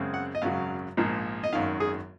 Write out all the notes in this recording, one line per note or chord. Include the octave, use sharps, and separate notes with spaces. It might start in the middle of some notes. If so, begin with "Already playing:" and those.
Already playing: F#2 C#3 G#3 C4
F#5
D#5
G#1 F#2 C#3 F#3 F5
A#1 G#2 F3 A#3
D#5
G#1 F#2 D#3 F5
G#4